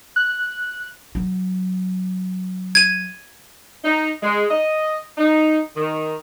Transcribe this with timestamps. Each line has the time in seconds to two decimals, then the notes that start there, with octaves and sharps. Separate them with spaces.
0.16 F#6
1.15 F#3
2.75 G#6 D#7
3.84 D#4
4.22 G#3
4.49 D#5
5.18 D#4
5.76 D#3